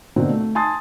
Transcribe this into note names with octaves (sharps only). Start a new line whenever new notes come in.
B2 D3 A#3 C4 D#4 F#4
A3
G#5 A5 C6 D#6 A6